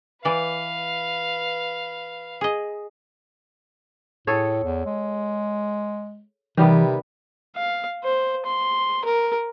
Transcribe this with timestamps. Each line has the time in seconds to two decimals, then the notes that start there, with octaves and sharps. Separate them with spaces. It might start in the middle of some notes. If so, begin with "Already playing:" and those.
0.25 E3 B4 D5 F5
2.41 G#4 D#5
4.27 A2 G#4 A4 C#5
4.63 E2
4.86 G#3
6.57 C3 D#3 E3 G3 B3
7.56 F5
8.04 C5
8.46 C6
9.05 A#4